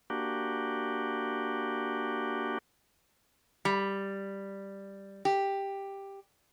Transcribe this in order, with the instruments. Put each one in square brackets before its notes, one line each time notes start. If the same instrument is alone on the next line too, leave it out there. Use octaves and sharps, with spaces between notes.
[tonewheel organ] A#3 D4 F#4 G4
[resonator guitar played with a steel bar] G3
G4